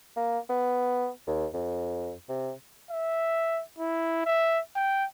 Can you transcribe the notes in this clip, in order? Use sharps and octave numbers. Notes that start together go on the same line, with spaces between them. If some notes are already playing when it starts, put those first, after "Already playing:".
A#3
B3
D#2
F2
C3
E5
E4
E5
G5